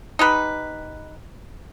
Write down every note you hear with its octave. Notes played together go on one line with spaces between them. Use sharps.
D#4 G4 B4